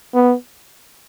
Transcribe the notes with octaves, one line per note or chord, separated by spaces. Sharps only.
B3